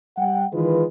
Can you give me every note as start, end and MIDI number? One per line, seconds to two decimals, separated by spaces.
0.17 0.44 55
0.17 0.44 78
0.17 0.44 79
0.53 0.84 51
0.53 0.84 52
0.53 0.84 56
0.53 0.84 65
0.53 0.84 71